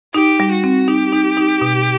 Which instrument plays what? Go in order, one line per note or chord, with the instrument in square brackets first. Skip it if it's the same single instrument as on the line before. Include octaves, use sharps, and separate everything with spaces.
[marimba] D#4 [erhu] G4
[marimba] G3
[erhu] F#4
[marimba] C4
[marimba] D#4 [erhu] G4
[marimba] D#4
D#4
B2